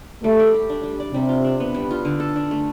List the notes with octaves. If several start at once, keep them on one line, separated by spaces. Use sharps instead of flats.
G3 A3
D5
G4
D4
G3
D5
C3 G3
F4
D4
B3
G3
F4
D3
A4
D4
A3